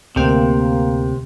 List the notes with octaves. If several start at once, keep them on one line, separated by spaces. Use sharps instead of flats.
D2 C3 A#3 G5